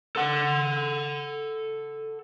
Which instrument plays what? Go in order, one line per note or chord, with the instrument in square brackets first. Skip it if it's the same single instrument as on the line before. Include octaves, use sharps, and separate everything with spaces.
[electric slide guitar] A4 F#5